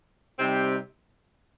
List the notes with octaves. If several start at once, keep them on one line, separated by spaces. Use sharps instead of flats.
C3 G3 C4 D#4 G4